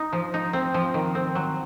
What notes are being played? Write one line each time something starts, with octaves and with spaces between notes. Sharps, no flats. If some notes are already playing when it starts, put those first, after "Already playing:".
Already playing: D#4
F3
D#4
C4
F3
D#3
C4
F#3